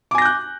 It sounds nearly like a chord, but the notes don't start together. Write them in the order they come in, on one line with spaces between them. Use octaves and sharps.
D6 G#5 A#6 G6 F#6